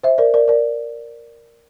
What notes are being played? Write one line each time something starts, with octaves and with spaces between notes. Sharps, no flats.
C5 E5
A#4 D5
A#4 D5
A#4 D5